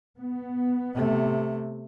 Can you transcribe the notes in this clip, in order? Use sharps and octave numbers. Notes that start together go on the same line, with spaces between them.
B3
C3 A3